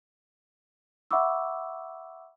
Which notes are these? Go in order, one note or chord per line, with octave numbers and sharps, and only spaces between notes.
E5 F#5 B5 C#6 D6 E6